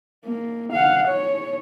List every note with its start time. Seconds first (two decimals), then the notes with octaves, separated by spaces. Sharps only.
0.25 A#3
0.72 F5 F#5
1.07 C#5